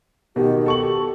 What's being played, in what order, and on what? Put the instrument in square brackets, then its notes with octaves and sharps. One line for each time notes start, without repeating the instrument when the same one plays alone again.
[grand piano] B2 D#3 [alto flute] G4
[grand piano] A4 C#6 F#7